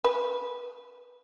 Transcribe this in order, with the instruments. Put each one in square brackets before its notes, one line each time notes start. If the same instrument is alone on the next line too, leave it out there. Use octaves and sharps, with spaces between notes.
[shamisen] B4